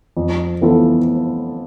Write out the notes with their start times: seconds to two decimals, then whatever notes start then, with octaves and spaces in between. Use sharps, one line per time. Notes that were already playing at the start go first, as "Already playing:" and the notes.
0.17 F2
0.61 E3 B3 F4 A4